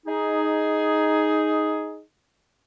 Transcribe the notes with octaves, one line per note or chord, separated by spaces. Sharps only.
D#4 G#4